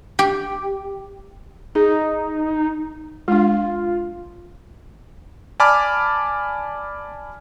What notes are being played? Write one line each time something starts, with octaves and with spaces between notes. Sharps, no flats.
G4
D#4 G#4
G#3 D4 F4
D5 G#5 A5 B5 D6 F6